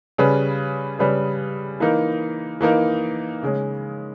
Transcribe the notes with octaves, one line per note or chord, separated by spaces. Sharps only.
C#3 G3 C#4 G#4 B4
C#3 G3 C#4 G#4 B4
E3 A#3 D#4 A#4
E3 A#3 D#4 A#4
C#3 G#3 C#4